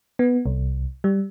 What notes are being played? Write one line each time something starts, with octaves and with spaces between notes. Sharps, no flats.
B3
C2
G3